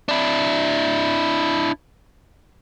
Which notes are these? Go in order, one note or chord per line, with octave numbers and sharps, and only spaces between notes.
D4 E4